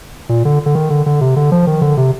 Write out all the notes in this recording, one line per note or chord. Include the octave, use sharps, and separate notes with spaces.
A#2
D3
D3
D#3
D3
D3
C3
D3
F3
D#3
D3
C3